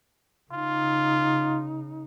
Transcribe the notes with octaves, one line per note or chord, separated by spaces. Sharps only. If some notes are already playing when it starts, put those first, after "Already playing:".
C#3 D#4 F4